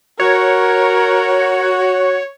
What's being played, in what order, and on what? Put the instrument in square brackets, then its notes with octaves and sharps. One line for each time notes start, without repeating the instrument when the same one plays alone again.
[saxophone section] F#4 [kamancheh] A#4 [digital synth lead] C#5